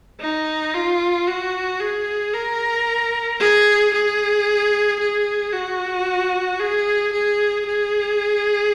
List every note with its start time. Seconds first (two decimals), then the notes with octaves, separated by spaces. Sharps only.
0.20 D#4
0.73 F4
1.27 F#4
1.80 G#4
2.34 A#4
3.40 G#4
3.94 G#4
5.00 G#4
5.53 F#4
6.60 G#4
7.13 G#4
7.66 G#4